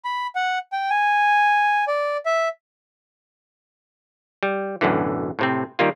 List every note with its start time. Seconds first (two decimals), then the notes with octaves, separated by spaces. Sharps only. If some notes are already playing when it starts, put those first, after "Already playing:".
0.05 B5
0.35 F#5
0.72 G5
0.90 G#5
1.88 D5
2.26 E5
4.43 G3
4.81 B1 F#2 A2 D3 E3
5.39 A2 C3 C4
5.79 D#3 G3 A#3 F4